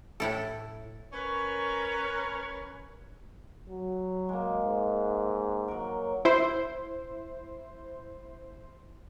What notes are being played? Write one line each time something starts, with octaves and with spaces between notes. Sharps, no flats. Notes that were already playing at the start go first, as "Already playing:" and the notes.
A2 E4 A4
C#4 A#4 B4 C#5
F#3
G#3 A#3
G#2
F#3 A#4
E4 C5